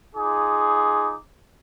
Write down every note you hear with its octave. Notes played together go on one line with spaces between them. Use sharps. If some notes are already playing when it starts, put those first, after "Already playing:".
D#4 F4 G#4 D6